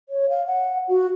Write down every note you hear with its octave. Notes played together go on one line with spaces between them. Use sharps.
C#5
F5
F#5
F#4